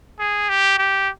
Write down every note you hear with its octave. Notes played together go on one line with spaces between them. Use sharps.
G#4
G4
G4